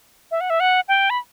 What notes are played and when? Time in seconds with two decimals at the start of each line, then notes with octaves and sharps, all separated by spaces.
0.31 E5
0.41 F#5
0.50 E5
0.60 F#5
0.88 G5
1.10 B5